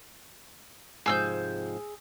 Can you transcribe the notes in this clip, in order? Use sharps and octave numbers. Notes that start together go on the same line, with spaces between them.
G#2 C3 F3 G#4 E6 G6